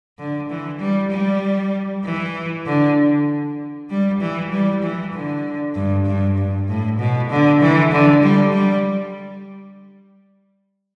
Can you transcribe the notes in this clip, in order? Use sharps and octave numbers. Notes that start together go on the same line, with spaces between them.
D3
E3
G3
G3
E3
D3
G3
E3
G3
E3
D3
G2
G2
G2
A2
B2
D3
E3
D3
G3
G3